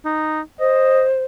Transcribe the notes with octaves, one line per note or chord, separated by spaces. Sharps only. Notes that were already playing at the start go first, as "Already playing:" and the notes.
D#4
C5 D#5